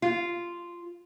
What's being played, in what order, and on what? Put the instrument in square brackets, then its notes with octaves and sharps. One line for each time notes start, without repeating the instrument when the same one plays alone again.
[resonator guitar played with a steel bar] F4